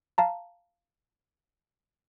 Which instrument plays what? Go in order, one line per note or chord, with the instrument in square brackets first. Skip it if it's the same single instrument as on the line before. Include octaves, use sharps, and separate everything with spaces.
[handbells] F5 A5 A#5